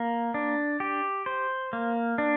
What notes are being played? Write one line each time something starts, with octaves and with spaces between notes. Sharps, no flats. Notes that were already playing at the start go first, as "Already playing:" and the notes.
Already playing: A#3
D4
G4
C5
A#3
D4